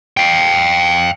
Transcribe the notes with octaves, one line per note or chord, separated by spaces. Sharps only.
F5 G5